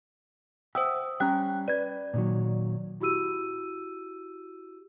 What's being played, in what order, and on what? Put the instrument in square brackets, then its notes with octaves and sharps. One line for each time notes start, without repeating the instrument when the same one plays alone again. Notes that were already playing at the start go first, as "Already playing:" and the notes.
[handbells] C5 D#6 E6 [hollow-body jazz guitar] E5 F#5 G5
[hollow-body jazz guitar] G3 C#4 A#5 [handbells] G5 F#6
[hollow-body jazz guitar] B4 [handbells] D5 G#6
[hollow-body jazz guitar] A#2 D#3 F#3
[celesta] E4 F#4 G4 E6 D#7